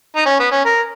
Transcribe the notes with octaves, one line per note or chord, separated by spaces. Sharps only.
D#4
C#4
B3
C#4
A#4